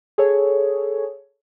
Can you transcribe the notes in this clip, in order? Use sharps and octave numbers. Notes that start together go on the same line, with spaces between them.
G#4 A4 C#5